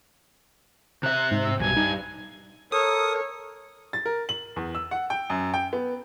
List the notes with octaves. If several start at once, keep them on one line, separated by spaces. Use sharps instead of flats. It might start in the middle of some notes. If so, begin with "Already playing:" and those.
C3 E5 F#6
G#2
E6
B1 E2 G2 B2 G#5
G2 D#4
A4 A#4 C#5 D#6
A6
A#4
F#7
E2
E6
F#5
G5
F#2
G5
B3